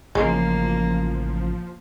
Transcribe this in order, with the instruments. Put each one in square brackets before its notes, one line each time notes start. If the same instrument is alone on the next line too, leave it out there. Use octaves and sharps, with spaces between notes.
[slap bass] A1 C#3 [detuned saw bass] F3 [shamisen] G#3 [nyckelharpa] A#3